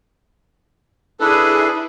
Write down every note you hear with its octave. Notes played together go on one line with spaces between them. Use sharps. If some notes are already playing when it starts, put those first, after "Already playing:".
D4 E4 G#4 A4 B4